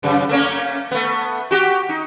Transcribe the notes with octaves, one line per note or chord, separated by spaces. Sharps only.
F#2 C#3
A3 A#3 C#4
A3 B3
F#4 G4
D#4